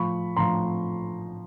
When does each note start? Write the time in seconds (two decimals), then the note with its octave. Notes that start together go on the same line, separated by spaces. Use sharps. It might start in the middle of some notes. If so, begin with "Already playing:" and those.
Already playing: A2 F3 B5 C#6
0.36 A2 F3 A#5 C6